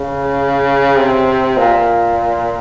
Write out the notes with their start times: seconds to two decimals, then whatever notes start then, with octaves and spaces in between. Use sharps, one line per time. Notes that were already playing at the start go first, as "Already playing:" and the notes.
Already playing: C#3
0.97 C3
1.57 A#2